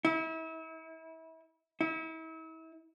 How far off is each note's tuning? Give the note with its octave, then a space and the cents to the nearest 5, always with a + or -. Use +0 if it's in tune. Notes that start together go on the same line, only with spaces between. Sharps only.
E4 -35
E4 -40